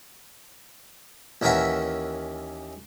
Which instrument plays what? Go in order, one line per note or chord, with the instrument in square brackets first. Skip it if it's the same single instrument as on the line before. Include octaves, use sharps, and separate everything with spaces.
[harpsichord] D#2 E3 C#4 A#4 E5 F#5